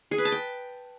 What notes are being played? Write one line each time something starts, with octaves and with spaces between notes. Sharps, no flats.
G#4
B4
A5
G5